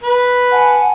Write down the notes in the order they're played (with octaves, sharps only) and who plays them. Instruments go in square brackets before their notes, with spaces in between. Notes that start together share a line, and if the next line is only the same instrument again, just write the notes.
[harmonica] B4
[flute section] F#5 G#5 A5